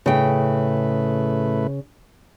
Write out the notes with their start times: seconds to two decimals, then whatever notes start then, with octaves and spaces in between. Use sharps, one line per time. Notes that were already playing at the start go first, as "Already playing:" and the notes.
0.06 A2 C#3 A3 B4 G5